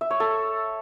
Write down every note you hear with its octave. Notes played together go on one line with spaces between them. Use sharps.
E5
C#5
A4